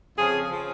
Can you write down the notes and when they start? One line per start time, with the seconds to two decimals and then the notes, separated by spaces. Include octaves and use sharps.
0.17 F2 C#3 F3 G#4
0.50 C#3 F3